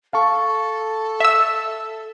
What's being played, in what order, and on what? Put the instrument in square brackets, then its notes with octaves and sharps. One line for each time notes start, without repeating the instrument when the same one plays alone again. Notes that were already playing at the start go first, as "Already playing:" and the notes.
[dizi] A4 [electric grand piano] F5 A5 C#6
[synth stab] E5 E6